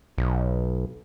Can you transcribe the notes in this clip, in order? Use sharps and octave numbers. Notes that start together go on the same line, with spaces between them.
B1